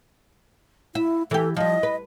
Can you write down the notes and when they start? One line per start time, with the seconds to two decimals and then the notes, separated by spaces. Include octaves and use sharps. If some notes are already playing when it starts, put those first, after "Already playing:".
0.95 E4 E5
1.31 E3 G4 A4
1.56 F3 G3 D#5
1.83 B4